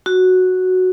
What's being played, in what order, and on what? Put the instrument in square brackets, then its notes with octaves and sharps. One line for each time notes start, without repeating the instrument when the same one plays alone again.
[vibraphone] F#4